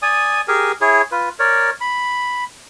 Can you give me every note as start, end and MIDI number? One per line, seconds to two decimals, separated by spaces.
0.02 0.41 74
0.02 0.41 80
0.02 0.41 87
0.48 0.72 67
0.48 0.72 68
0.48 0.72 70
0.48 0.72 80
0.81 1.02 64
0.81 1.02 68
0.81 1.02 73
1.12 1.29 65
1.12 1.29 71
1.39 1.70 70
1.39 1.70 73
1.39 1.70 74
1.81 2.44 83